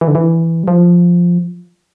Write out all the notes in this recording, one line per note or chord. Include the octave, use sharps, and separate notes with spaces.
E3
D3
E3
G3
F3